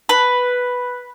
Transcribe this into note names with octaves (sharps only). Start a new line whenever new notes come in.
B4